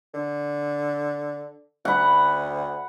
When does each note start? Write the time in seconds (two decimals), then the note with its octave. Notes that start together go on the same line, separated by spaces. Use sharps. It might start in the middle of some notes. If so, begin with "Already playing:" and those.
0.14 D3
1.85 D2 F#5 B5